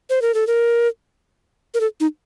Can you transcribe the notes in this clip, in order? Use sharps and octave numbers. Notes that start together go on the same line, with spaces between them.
C5
A#4
A4
A#4
A#4
A4
D#4